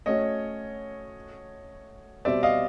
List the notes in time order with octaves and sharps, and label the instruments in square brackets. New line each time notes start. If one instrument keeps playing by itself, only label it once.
[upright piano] A3 C#4 F#4 [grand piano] C#5 D#5
[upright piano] B2 G3 C4 [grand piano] D5 E5
[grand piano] D#5 F5